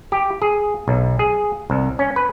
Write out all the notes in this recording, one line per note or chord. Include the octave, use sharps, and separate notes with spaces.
G4
G#4
B1
G#4
C2
C#4
B4